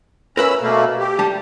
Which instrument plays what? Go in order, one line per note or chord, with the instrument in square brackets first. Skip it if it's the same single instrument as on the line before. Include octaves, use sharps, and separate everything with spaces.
[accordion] C#4 B5 E6 [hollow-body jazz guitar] A#4 B4 E5
[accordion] B2 A3 A#3
G4
[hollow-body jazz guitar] G3 A5